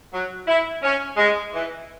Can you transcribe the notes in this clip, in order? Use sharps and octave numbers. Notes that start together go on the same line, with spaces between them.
F#3
E4
C#4
G#3
E3